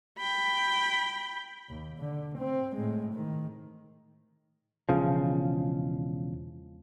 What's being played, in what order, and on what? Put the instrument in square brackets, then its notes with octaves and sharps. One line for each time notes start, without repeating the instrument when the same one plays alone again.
[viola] G5 B5
[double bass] D#2
D3
C4
A2 G#3
D#3
[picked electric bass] E1 C#3 F3